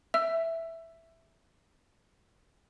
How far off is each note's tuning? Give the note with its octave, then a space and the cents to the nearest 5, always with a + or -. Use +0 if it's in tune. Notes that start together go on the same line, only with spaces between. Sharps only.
E5 +0 E6 +20